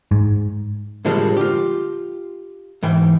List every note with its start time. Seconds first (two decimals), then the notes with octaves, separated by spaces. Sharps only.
0.11 G#2
1.05 A2 D3 F3 G3 G#3 A#3
1.37 F4 G4
2.83 G#2 E3 G5